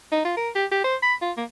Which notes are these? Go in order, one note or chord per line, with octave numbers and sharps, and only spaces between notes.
D#4
F4
A#4
G4
G4
C5
B5
F4
A#3